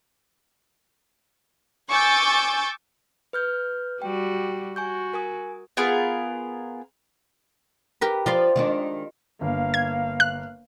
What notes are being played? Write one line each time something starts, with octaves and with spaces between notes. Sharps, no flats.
G#5 C#6 D6 E6 G6 A6
B4 F6 G6
G3 F#4 G5
F#4 G#5 C#6 G6
A#4 G#5 D#6
B3 F4 G#4 A#4
G4 A#4 B4
F3 F4 D5 C6
D#3 G#3 D4
G1 A#3 F5
G#6
F#6